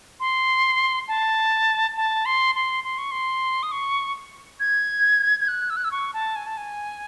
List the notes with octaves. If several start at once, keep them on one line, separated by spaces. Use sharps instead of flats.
C6
A5
A5
C6
C6
C6
C#6
C6
D#6
C#6
G#6
G#6
F#6
E6
F#6
E6
C#6
A5
G#5
A5
G#5